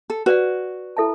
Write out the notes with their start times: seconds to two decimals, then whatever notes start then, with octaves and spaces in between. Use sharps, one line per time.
0.10 A4
0.26 F#4 B4 D5 F#5
0.97 E4 A4 E5 A5